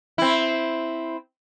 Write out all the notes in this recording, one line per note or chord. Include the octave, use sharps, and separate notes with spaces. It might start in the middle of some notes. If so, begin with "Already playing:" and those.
C4 E4